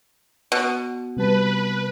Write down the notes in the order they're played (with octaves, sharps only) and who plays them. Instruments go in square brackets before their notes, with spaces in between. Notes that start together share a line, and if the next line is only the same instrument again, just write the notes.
[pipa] B2
[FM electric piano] C3 G3 A5 [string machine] B4